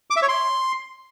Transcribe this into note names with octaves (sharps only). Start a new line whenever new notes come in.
D6
E5
C#5
C6